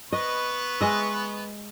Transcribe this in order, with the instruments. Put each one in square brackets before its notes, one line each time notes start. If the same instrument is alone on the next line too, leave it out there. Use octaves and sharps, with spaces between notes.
[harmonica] B3 B4 C#6 [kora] D#5
[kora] G#3 D#5 E5